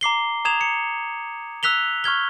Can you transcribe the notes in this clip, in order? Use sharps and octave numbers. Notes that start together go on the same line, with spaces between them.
A#5 D6 C7 G7
A#5 D#6 G#6 E7 F7
C#7
E6 F#6 B6 F7 G7
C#6 F6 G#6 G7